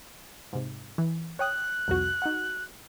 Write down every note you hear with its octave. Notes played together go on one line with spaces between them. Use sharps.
G#2 C3
E3
C#5 G5 D#6 F#6
C2 F2 F#4
D#4 F#4 F#5